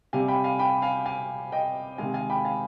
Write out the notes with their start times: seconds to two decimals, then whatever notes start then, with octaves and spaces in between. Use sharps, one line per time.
0.13 C3 G3 F5 G#5
0.28 G5 B5
0.44 F5 G#5
0.59 G5 B5
0.82 F5 G#5
1.06 F5 G#5
1.52 D#5 G5
1.98 C3 D#3 G#3 F5 G#5
2.14 F5 G#5
2.30 G5 B5
2.45 F5 G#5